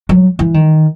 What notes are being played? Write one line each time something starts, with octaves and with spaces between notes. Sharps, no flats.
F#3
E3
D#3